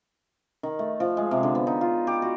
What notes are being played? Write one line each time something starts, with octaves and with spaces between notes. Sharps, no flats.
D#3
A3
F3
G#3
C3
D3
B3
D#4
F4
G4
F#4